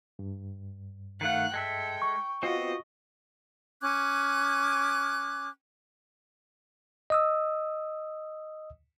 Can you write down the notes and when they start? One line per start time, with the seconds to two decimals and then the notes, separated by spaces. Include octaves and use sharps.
0.19 G2
1.21 D#3 A3 F5 F#5 F#6
1.54 G#3 A4 E5 G5
2.02 C#6
2.43 B3 C4 F4 F#4 D#5
3.81 C#4 D6 F#6 G#6
7.10 D#5 D#6 E6